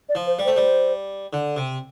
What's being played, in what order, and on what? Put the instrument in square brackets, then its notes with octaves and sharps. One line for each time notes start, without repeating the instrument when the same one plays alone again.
[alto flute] D5
[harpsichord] F3
[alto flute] C5
[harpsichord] G3
[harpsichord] A3 [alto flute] C5
[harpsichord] G3
D3
C3